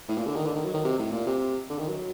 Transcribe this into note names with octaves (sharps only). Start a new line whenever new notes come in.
A2
A#2
D3
D#3
D3
D#3
F#3
D#3
C3
A2
A#2
C3
D3
D#3
F#3